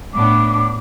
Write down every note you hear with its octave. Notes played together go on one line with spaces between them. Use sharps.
A2 B3 D4 D6